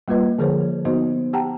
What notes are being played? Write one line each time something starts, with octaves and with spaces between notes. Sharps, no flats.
G3 A#3 F4 B4 D#5
D3 F3 G#4 A#4 C5 C#5
B3 D#4 F#4 C5 D#5
G4 F#5 G5 A5 A#5